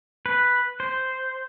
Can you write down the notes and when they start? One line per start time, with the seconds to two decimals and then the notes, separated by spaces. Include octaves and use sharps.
0.26 B4
0.80 C5